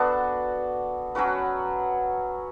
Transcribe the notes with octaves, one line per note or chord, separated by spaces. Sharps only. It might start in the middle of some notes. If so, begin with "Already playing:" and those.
Already playing: B3 D4 F#4 A4
F#3 C#4 F#4 B4